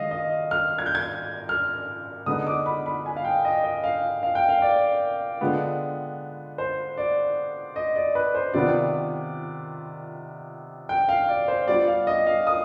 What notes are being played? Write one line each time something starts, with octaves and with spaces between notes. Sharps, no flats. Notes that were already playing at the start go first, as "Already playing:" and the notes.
Already playing: D#3 G#3 D#5 F5
D#5
F6
G#6
G6
G#6
F6
D3 G#3 B3 D#4 D#6
D6
B5
B5
G#5
F5
G5
D#5
D#5
F5
F5
G5
F5
D5
D3 G#3 B3 F4
C5
D5
D#5
D5
B4
C5
C3 D#3 B3 F4 D5
G5
F5
D5
C5
G3 B3 F4 D5
F5
D#5
F5
D#6